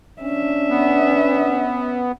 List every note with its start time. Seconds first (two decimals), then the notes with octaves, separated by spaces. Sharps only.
0.22 C#4 D4 E5
0.70 B3